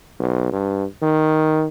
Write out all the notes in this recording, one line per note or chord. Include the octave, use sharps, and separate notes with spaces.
B1
G2
D#3